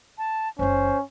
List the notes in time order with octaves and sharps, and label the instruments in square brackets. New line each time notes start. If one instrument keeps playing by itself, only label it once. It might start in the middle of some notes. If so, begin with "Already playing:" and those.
[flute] A5
[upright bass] F#1 E3 [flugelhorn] C#4 [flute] C5